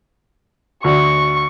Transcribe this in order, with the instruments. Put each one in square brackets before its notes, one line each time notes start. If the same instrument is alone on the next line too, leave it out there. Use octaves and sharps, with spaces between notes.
[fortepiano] D2 F#4 [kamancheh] C#6